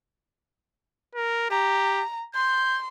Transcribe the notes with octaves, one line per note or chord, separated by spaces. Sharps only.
A#4
G4 A#5
C6 G6